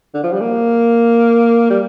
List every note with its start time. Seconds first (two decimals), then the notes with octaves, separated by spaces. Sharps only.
0.14 D3
0.24 F3
0.33 G3
0.41 A#3
1.70 G3